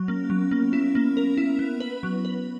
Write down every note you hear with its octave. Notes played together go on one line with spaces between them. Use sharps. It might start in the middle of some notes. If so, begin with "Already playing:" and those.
Already playing: F#3
A#3 C#4
F#3 B3
C#4
A#3 B3
B3
C#4 E4
A#3 B3
C#4 A#4
E4
B3
B4
F#3 B3
B4